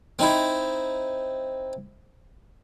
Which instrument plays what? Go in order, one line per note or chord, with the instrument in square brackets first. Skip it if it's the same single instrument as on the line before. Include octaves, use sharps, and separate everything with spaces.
[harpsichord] C4 D#4 E4